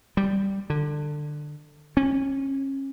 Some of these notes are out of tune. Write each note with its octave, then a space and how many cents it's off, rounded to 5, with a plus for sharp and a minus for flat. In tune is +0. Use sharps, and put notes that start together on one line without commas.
G3 -5
D3 +20
C#4 -30